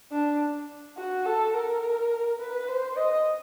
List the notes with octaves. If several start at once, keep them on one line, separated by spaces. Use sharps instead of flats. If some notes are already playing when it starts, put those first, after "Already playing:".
D4
F#4
A4
A#4
B4
C5
D#5